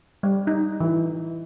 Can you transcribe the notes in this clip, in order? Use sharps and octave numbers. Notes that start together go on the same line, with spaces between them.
G3
D#4
E3